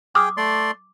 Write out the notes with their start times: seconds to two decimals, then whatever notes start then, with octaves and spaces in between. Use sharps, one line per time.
0.15 G#4 G5 D6 D#6 F6
0.37 A3 D5 C6